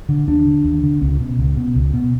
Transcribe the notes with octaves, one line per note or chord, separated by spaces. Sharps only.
D3
D#2 D4
D3
D#2
D3
C#2 C#4
B2
C#2
B2
C#2
B2